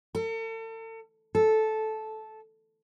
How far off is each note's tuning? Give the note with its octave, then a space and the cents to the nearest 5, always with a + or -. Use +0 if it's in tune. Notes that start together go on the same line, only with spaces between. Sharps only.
A4 +40
A4 -10